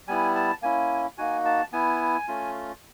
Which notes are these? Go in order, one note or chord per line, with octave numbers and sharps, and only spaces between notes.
G3 B3 E4 G#5
A5
A#3 C#4 E4 G#5
A#3 D#4 F#4 G#5
A5
B3 E4 G#5
A3 C#4 F4